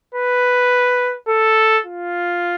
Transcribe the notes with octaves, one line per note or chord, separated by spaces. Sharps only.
B4
A4
F4